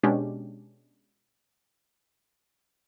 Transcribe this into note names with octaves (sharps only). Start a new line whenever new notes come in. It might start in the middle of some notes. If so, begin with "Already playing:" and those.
B2 G#3 C#4 D4 G4